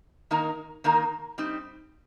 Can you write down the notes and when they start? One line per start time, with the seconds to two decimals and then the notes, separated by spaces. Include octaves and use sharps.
0.31 D#3 A#3 D#4 A#4
0.84 D#3 A#3 D#4 A#4
1.38 G3 C4 D#4